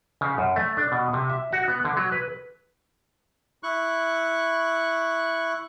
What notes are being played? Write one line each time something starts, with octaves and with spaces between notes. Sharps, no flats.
C#3
F#2
A3
D4
B2
C3
E5
F#4
B3
D3
F#3
B4
E4 C#6 F#6